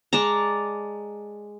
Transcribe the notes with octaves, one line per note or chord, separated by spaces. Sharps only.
G#3 D5 A5 A#5